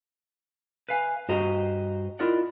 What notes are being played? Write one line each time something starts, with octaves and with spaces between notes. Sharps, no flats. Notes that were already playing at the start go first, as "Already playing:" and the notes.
B4 E5 F5 G#5
G2 F#4 G4 C5 D#5 A#5
E4 F4 A#4 D5 D#5 F#5